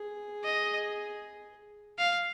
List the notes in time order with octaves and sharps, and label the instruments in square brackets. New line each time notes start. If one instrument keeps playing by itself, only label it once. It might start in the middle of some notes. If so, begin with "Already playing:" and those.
Already playing: [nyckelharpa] G#4
[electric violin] D#5
F5